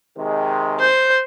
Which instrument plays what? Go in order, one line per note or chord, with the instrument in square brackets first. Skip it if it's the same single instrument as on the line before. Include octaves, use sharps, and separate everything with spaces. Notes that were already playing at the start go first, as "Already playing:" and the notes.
[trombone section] C3 D#3 G#3
[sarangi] C5 [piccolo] G6